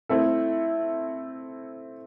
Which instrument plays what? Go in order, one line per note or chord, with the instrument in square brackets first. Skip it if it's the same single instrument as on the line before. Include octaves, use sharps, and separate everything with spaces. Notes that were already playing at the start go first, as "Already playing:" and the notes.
[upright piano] A3 C4 E4 A4